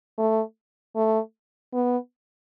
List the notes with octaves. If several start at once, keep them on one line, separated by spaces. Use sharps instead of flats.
A3
A3
B3